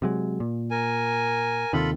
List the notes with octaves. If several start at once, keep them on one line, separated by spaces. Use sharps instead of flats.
C3 F#3 G#3
A#2
A#4 G#5
D#2 C3 D#3 F4 A4 B5